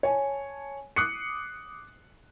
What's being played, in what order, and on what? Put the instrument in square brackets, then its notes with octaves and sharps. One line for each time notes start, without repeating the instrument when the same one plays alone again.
[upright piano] C#5 G#5 A5
D6 D#6 F#6 C7 C#7